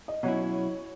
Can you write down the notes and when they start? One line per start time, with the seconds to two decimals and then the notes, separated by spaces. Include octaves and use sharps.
0.08 D#5
0.23 B2 F#3 C#4 E4 C#5